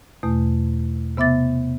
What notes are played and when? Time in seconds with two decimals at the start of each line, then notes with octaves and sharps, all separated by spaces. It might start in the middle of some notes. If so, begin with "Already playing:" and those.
0.23 E2 B2 A3
1.17 C3 B3 E5 D6 A6